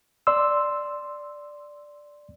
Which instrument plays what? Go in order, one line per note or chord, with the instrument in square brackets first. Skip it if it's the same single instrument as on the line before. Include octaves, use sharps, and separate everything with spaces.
[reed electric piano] D5 C6 E6